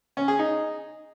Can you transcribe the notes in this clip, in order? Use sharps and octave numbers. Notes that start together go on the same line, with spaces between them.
C#4
G#4
D#4